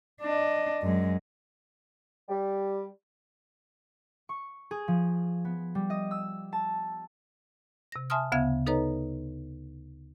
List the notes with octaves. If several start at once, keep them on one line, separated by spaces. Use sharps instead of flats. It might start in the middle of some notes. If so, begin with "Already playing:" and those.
D4 D#5
F#2 G#3
G3
C#6
G#4
F3
B3
G3
D#5
E6
A5
C3 A#6
E5 G#5 A5 C6 D#6 F6
D2 C#3 B3 E5 F5 G#6
D#4 A4 B4 C#5 D#5 A#5